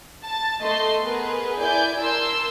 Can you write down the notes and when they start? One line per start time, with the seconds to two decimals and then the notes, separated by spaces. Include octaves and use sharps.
0.24 A5 A6
0.61 A3 D#5 A5 C6
1.02 B3 G#4 A#4 B4
1.59 E4 D5 G#5 G6
2.01 A#4 A5 C6 E6